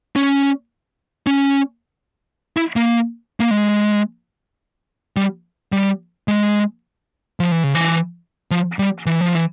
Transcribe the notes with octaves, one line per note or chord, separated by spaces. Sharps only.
C#4
C#4
E4
A#3
A#3
G#3
G3
G3
G#3
F3
E3
C#3
E3
F3
G3
E3
F3
E3